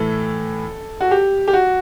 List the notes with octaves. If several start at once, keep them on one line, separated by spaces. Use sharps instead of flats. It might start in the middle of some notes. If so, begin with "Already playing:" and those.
Already playing: A2 E3 A4
F#4
G4
G4
F#4